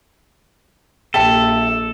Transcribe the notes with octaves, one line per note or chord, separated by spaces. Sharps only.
A#1 G4 A4 E5 A5